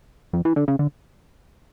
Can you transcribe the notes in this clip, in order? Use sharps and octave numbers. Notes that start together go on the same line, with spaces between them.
F2
E3
D3
C#3
D3